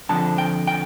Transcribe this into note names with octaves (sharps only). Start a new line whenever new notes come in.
F2 D3 F3 A5
G5
G5